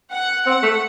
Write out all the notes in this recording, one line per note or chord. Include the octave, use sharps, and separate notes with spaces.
F#5
C4 F#5
A3